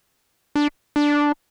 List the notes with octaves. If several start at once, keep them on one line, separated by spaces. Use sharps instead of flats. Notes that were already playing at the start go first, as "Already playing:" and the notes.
D4
D4